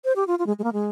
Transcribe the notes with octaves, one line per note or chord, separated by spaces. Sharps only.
C5
G4
F4
F4
G#3
G#3
A#3
G#3